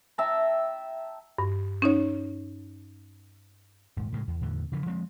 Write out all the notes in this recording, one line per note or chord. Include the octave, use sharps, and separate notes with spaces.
E5 G5 A5 A#5
G2
C#4 D#4 C#5
D#1 G#2
A2 C#3 F#3 G#3
E2
E2 A2 D3
C#3 E3 F3
F3 G#3 C4